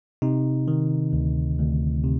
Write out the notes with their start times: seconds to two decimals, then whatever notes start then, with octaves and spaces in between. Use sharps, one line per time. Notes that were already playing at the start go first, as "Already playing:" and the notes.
0.22 C3 D#4
0.68 D#3
1.13 D2
1.59 D2
2.04 C3